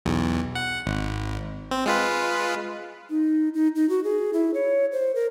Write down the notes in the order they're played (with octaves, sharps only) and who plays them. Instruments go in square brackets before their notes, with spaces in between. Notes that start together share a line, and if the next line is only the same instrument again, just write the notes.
[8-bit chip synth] B1 E2
F#5
G#1
C4
G#3 F4 B4
[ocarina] D#4
D#4
D#4
F#4
G#4
E4
C#5
C5
A#4